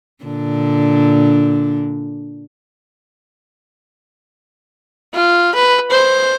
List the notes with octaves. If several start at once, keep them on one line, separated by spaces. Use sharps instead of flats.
A#2 D3 D4
F4
B4
C5